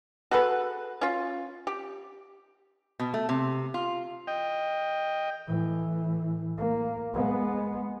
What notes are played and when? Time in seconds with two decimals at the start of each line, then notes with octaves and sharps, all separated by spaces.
0.31 F#4 G#4 A4 B4
1.01 C#4 F4
1.67 G4
2.99 B2
3.14 A3
3.29 C3
3.74 F4
4.27 D#5 G5
5.46 A2 E3
6.58 A#3
7.14 G#3 B3